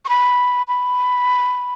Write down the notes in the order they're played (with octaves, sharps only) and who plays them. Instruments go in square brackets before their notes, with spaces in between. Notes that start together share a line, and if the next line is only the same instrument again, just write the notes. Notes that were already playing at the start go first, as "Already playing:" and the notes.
[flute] C#6
B5
B5